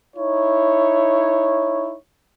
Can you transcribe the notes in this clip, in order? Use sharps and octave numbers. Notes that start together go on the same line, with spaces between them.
D#4 E4 C#5